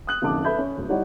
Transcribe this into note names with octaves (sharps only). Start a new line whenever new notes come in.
D#6 F#6 F#7
F#1 F2 D#3 A5 D6
A4 B4 E5 B5 G6
C#4
D1
G3 D#4 E4 C#5 D5 F#5